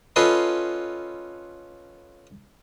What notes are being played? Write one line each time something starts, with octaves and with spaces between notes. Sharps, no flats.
C#4 F4 A4 B4 D#5 C6